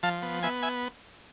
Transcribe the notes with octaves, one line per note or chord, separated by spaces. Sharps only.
F3 F5 A5
B3
B3 E5 G#5
E5 G#5